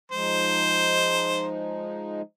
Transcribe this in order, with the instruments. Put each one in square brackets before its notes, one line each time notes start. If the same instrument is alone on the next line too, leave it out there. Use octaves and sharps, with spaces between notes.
[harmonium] F3 G#3 D#4 [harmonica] C5